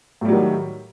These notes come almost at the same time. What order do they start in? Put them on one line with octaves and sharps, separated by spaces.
A2 G3 F#3 D#3